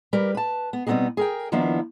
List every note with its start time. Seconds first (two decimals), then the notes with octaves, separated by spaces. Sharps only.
0.13 G3 G4 A#4 B4
0.35 B4 A5
0.73 B3
0.87 B2 G3 B3 C4 D#4 G#4
1.17 G#4 A#4 G5
1.52 D#3 F3 A#3 B3 D4 E4